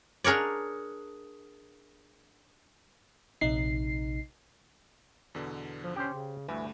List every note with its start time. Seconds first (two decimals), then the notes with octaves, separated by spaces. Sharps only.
0.24 D4 G#4 A#4 C#5 D5
3.41 A#1 C3 D#4 C7
5.35 E2 B2 D3
5.84 F3
5.96 C#4 G4 C5
6.13 C#3
6.48 D2 G2 E3 A3